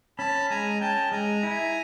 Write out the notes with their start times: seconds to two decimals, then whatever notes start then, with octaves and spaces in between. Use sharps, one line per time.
0.18 C#4 A5 B5
0.50 G#3 G#5 A#5
0.81 C#4 G5 A5
1.12 G#3 G#5 A#5
1.43 E4